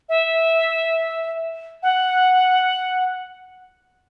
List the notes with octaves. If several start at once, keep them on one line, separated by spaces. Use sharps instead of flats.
E5
F#5